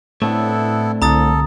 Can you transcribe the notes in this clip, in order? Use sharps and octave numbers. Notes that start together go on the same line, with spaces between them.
A2 A3 B3 C4 D4 E4 A4
C2 D3 A4 A#5 D#6 A6